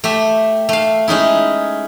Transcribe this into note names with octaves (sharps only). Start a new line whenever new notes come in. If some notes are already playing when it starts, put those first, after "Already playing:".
A3 G4 E5
A3 F5
G#3 C#4 D#4 E4